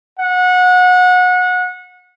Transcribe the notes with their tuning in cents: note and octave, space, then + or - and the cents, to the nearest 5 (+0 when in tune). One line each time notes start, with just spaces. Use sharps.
F#5 -25